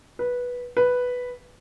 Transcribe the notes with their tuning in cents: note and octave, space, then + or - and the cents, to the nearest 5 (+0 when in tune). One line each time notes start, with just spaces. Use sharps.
B4 -10
B4 +0